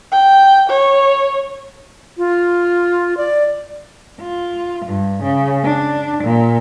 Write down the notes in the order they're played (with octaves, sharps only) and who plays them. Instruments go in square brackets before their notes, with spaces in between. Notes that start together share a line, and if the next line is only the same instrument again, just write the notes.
[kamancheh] G5
C#5
[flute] F4
D5
[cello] F4
G2
C#3
D4
A#2